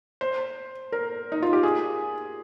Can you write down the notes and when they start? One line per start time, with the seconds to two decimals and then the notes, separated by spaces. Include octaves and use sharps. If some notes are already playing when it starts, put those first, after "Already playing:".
0.21 C5
0.92 A#4
1.32 D#4
1.42 F4
1.53 G4
1.63 G#4